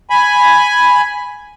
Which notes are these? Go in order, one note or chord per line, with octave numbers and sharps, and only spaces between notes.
G#5 B5